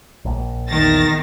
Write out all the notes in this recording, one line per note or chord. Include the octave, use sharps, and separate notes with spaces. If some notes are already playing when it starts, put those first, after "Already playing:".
A#1
E2 D#3 A6 A#6